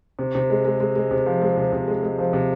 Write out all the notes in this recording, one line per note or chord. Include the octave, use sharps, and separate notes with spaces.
C3
C3
G#3
G#3
G#3
G#3
C3
F3
G#3
C3
C3
G#3
G#3
F3
C3